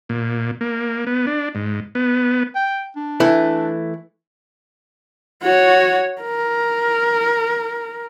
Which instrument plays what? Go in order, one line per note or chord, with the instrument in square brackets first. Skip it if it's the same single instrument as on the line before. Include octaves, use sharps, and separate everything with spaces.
[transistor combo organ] A#2
A#3
B3
D4
G#2
B3
[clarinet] G5
D4
[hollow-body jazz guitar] E3 A3 E4
[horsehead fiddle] F#4 C#5
A#4